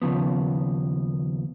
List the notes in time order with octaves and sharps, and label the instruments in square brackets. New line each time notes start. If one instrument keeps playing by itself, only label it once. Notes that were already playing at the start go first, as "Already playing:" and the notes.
[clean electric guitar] D#2 C#3 F3 B3